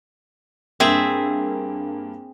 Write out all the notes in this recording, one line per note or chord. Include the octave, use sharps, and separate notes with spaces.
G2 A#3 C4 G#4 E5